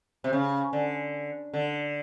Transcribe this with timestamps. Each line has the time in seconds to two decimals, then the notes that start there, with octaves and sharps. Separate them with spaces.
0.24 C3
0.33 C#3
0.73 D3
1.54 D3